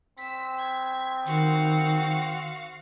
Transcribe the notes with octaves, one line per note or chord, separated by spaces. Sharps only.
C4 E6 B6
G#6 B6
D#3 F#4 F5